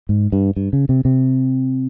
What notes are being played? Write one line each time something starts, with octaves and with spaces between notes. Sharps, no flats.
G#2
G2
G2
C#3
C3
C3